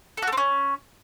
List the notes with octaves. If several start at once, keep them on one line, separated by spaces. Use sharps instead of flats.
A4
F#4
A3
C4
C#4